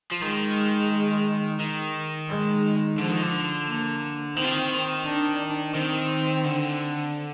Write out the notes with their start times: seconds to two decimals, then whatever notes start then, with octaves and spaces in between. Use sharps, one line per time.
0.12 F3
0.22 D#3 G#3
1.60 D#3
2.29 G#3
2.98 D3 F3
3.10 D#3
3.23 D3
3.67 A#3
4.36 D#3 C4
4.44 F3
4.51 D#3
5.05 D4
5.75 D#3 C4
6.44 D3